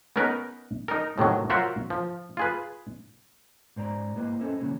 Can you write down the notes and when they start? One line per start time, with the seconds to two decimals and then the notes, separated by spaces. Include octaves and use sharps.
0.16 B3 C#4 D#4 A#4 B4
0.88 D#4 A#4
1.18 A2 C3 D#3 F#3
1.50 F#3 F4 A#4 C5 E5 F#5
1.90 F3
2.37 F4 G#4 B4
3.76 G#2 C5 D5 A#5
4.16 A#3 E4 B4 C5 D#5
4.40 C#4 A4 C5 D#5 E5
4.60 C#3 E3 F#3 A#3 C#4